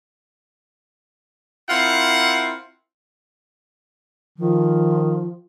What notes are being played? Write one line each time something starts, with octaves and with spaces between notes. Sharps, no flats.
C4 E4 F4 A#4 F#5
D#3 F3